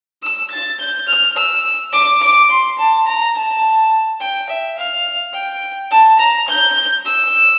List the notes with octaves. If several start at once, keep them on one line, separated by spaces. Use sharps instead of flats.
E6
A6
G6
F6
E6
D6
D6
C6
A5
A#5
A5
G5
E5
F5
G5
A5
A#5
G6
E6